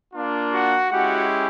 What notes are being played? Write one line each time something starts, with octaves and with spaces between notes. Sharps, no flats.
A#3 D4 F4
F#4 F#5
G#3 C#4 E4 F#4 G4 F#5